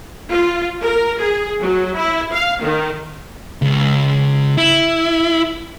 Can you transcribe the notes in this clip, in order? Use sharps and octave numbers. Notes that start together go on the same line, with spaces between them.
F4
A#4
G#4
F#3
E4
F5
D#3
C#2
E4